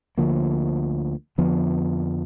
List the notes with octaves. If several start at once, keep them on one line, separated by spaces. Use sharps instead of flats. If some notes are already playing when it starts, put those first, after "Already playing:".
D2 D3 F3 A#3
F2 D3 F3 B3